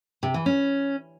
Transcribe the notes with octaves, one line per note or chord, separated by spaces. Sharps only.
C3
E3
C#4